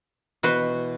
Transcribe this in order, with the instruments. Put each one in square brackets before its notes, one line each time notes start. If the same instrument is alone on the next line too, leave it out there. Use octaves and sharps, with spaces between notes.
[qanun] B2 E3 [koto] F#4 B4 C5